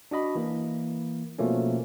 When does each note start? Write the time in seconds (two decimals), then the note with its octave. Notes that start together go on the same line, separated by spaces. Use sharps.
0.11 D4 F#4 D#5 B5
0.35 E3 A#3
1.38 B2 F3 A3 A#3 C#4